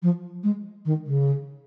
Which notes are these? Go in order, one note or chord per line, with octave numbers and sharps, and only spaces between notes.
F3
G#3
D#3
C#3